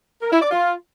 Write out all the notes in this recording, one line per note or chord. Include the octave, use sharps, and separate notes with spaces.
A#4
E4
D5
F4